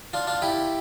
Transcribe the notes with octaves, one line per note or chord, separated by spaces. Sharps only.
D4 F4
D4 F4
E4 G4